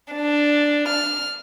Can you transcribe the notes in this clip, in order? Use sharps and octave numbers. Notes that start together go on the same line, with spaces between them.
D4
F6